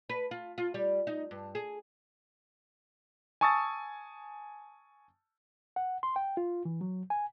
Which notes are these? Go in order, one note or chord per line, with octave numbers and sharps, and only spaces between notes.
B4
F4
F4
G3
D#4
G2
G#4
G#5 A5 C#6 D#6 E6 A6
F#5
C6
G5
F4
E3
F#3
G#5